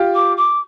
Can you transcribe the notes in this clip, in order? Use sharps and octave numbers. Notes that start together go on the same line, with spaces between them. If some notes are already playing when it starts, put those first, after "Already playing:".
Already playing: F4 G4
D6
D6